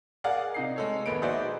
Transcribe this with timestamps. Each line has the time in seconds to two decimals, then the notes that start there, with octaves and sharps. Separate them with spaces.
0.24 G#4 A#4 D5 F5 F#5
0.54 C3 D#4 C7
0.76 G#3 A4 C#5
1.06 A#1 D#2 A#3 B3 B5 D7
1.22 D#4 F#4 G#4 C5 D5 E5